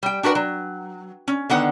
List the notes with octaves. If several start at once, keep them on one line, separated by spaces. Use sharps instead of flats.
G3 G5
D4 F#4 A#4 B4 F#5
F#3
C#4
D3 D#3 B3 F#5